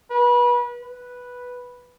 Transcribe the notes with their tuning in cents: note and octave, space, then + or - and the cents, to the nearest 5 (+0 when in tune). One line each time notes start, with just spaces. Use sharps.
B4 -30
B4 -5